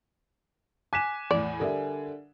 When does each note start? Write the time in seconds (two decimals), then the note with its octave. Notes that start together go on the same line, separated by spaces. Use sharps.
0.93 G#5 D6 F#6 B6 E7
1.31 E2 A2 D5
1.60 D3 G3 A4 A#4 E5